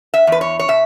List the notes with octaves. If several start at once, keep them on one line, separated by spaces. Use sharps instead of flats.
E5
E2 B4
C#5
C#5
B2 E5